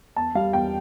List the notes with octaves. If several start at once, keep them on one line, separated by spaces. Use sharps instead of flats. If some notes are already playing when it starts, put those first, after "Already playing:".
E2 A5
G3 F5
E2 G5